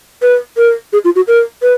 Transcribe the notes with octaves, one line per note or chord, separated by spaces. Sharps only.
B4
A#4
G#4
F4
F#4
A#4
B4